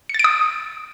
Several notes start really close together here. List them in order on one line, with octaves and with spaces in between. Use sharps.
C#7 A6 D7 D#6